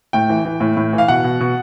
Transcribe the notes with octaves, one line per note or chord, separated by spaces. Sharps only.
A2 G5
E3
E3
A2
A2
E3
F5
B2 F#5
B2
B2